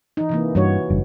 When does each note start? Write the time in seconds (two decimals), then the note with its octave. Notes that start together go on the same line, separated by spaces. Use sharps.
0.17 E3 D#4
0.29 C3 E3 A#3
0.55 G2 E3 F#4 C#5
0.90 F#1 G2